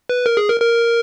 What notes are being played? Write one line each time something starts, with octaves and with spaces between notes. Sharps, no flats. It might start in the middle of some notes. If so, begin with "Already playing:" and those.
B4
A#4
G#4
A#4
A#4